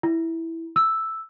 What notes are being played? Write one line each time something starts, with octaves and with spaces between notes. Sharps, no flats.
E4
E6